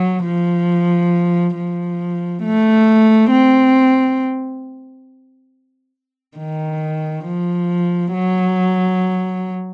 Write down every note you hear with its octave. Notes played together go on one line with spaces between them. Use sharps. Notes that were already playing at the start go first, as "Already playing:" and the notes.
Already playing: F#3
F3
F3
A3
C4
D#3
F3
F#3